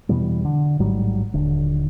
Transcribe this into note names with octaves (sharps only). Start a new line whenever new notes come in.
E2 B2 E3 G3
D3
A1 G#2 F#3 G3
D#1 D3